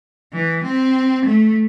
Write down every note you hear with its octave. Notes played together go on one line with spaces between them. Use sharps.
E3
C4
A3